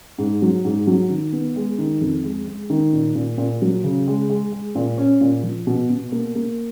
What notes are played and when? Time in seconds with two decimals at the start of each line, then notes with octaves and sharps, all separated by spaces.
0.18 G#2
0.42 F#3
0.65 G#2
0.87 F#3
1.10 D#3
1.32 B3
1.56 G#3
1.78 D#3
2.01 F2
2.24 G#3
2.48 G#3
2.70 D#3
2.93 A#2
3.15 A#2
3.38 A#2
3.62 F#3
3.84 C#3
4.07 G#3
4.30 G#3
4.52 G#3
4.75 A#2
4.98 C#4
5.21 A#2
5.43 F3
5.67 B2
5.90 B2
6.12 A#3
6.35 A#3